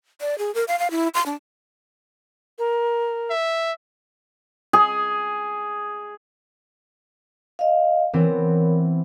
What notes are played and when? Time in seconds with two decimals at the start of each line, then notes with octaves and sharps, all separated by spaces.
0.21 D5
0.38 G#4
0.55 A#4
0.68 F5
0.79 F5
0.91 E4
1.14 C6
1.26 D4
2.59 A#4
3.30 E5
4.73 G#4
7.59 D#5 F5
8.14 E3 B3 C4 A#4 C#5